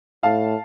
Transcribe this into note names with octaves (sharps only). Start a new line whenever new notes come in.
A2 F5 A5